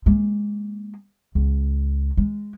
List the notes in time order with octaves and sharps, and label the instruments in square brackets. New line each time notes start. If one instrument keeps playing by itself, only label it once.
[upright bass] G#3 A#3
C#2
G#3